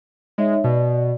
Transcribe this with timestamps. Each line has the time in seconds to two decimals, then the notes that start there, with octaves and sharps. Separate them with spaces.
0.38 G#3 D#4 C#5 E5
0.64 B2 D5